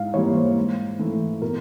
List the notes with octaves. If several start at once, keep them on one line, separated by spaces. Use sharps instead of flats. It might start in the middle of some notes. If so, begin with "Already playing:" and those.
Already playing: G#2 F5
E3 G3 A#3 C#5
C5
G#2
E3 A3
B2 A#4